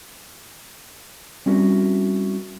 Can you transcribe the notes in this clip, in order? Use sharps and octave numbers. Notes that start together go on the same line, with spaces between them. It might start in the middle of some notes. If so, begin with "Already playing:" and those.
G3 C4 C#4 E4 F#4 A#4